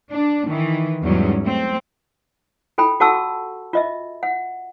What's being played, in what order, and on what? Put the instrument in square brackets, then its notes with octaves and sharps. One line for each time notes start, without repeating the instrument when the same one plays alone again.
[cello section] D4
D#3 E3
E2 G#2 F#3 G3 C#4
A3 C4
[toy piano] F4 A4 G5 B5
F#4 A4 F#5 A5 C#6 E6
F4 D#5 E5
F#5